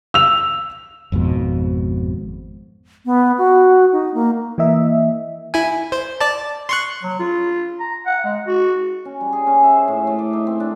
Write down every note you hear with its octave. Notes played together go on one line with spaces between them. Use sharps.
E6 F7
G#1 F2 G#2 B2
B3
F#4
D#4
A#3
E3 A#3 D#5 E5
E4 G#5
C5
D5 A5
C6 C#6 F#6
F#3
F4
A#5
F#5
G#3
F#4
C#4
G3
G#4
C#4
E5
C5
A2
A3
D6
D#4
C4
D4